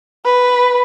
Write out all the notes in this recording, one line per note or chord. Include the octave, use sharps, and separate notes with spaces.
B4